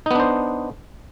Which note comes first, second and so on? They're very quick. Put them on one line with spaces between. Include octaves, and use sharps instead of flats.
D#4 B3 D4 C5